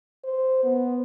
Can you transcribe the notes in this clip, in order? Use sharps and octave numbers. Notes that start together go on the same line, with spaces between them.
C5
B3